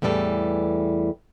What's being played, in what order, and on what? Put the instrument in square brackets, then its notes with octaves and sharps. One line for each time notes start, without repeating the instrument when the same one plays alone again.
[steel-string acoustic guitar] E2 A2 E3 G3 A4